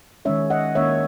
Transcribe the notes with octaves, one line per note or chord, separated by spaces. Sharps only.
D#3 G#3 C#4 C#5 E5
D#5 F#5
D#3 A#3 C#4 C#5 E5